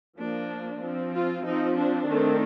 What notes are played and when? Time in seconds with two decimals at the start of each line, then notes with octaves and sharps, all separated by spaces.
0.19 F3 A#3 D4
0.83 F3 C4
1.15 F4
1.46 F3 C4 D#4
1.78 D4
2.09 D#3 A3 C4